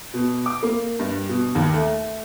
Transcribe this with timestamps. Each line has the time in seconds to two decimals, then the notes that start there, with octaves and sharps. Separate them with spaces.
0.14 B2
0.46 D6
0.63 A#3
0.99 G2
1.29 B2
1.55 D#2
1.74 A3